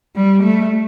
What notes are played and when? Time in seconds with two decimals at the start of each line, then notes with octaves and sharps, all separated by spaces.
0.16 G3
0.43 A3